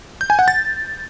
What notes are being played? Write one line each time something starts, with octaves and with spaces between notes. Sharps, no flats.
G6
G#5
F#5
A6